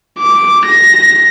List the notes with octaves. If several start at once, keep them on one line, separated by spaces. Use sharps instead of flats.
D6
A#6